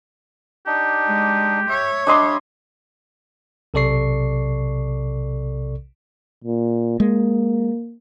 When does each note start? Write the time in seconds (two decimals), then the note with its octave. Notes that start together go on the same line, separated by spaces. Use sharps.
0.67 D4 D#4 G4
1.07 G#3
1.69 C#5 E5
2.07 G3 D4 D#5 E5 C6
3.74 B1 C3 A4 D5 C#6 C7
6.44 A#2
7.00 G#3 A#3